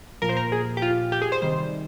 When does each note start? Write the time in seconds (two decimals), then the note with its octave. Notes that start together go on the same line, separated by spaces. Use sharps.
0.22 A#2 F3 A#4
0.29 C5
0.37 A#4
0.52 G#4
0.77 G4
0.82 F4
1.12 G4
1.22 G#4
1.32 C5
1.42 C3 D#3 G3 C5